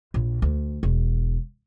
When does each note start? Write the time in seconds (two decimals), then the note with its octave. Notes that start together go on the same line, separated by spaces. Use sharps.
0.14 A#1
0.42 D2
0.83 E1